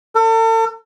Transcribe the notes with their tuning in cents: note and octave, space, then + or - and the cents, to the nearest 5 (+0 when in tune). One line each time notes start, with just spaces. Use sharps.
A4 +40